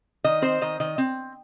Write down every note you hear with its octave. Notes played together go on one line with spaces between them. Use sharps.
D#3 D#5
C4 C5
D#3 D#5
D#3 D#5
C4